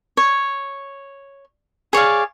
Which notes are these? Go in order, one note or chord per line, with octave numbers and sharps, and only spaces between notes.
C#5
G#4 C#5 D5 F5